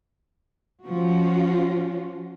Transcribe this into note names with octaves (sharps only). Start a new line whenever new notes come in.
F3 C#4 F4 F#4